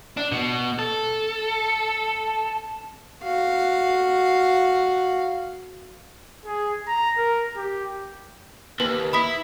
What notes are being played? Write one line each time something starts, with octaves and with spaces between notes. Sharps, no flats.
D4
B2
A4
F#4 F5
G#4
A#5
A#4
G4
D#2 B4
E4 B5 D#6 B6